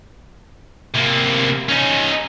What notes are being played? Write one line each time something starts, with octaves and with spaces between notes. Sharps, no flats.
C3 A#3
C#4 D#4